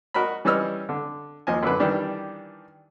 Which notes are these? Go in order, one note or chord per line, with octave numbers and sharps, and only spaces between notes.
F#4 A#4 D#5 B5
E3 G3 C#4 D#5 E6 F6
D3
D#2 F3 D#5 G#5
F#2 D3 B4
D#3 E3 G3 D4 G4